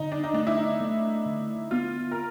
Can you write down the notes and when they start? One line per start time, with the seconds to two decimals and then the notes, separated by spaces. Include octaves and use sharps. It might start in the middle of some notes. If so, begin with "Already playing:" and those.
Already playing: D3 D#4
0.12 D4
0.24 D#4
0.34 A3 D4
0.47 E4
0.57 D#4
0.81 A3
1.26 D3
1.71 B3 F4
2.11 A#4